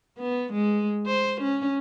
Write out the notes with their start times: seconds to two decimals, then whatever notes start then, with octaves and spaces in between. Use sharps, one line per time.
0.19 B3
0.53 G#3
1.06 C5
1.41 C#4